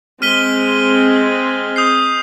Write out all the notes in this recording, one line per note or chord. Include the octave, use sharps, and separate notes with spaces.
G#3 C4 F6 B6 D#7 G7
D#6 G6 C7